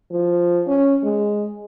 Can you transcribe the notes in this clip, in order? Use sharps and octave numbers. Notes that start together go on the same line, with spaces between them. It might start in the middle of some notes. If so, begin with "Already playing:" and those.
F3
C#4
G#3